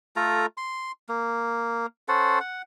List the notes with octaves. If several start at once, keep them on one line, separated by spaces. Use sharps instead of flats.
A3 F4 A4 A#5
C6
A#3
C#4 A4 C5 F#5
F#5